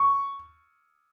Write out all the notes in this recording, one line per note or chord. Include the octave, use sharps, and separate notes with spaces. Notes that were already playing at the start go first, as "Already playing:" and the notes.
Already playing: C#6